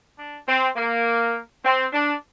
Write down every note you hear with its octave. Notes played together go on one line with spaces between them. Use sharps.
D4
C4
A#3
C4
D4